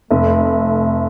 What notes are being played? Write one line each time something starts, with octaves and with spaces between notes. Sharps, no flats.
F1 A3